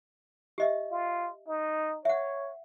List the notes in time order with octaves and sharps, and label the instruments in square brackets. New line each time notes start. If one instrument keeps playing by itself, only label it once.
[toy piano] G4 D#5 E5
[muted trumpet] F4
D#4
[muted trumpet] C#5 [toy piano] E5 F#5